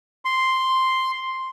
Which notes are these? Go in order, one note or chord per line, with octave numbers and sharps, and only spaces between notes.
C6